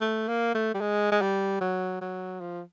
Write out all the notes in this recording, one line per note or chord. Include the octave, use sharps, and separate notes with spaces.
A3
A#3
A3
G3
G#3
G#3
G3
F#3
F#3
F3